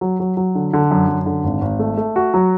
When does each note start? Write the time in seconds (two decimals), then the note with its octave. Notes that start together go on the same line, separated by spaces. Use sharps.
0.01 F#3
0.20 F#3
0.37 F#3
0.55 D3
0.73 D3
0.91 F#2
1.08 F#2
1.26 D3
1.44 G#1
1.61 G#1
1.79 A3
1.97 A3
2.16 F#4
2.34 F#3